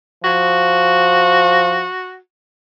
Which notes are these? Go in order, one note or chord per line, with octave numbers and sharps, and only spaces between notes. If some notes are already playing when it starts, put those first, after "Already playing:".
F3 F#4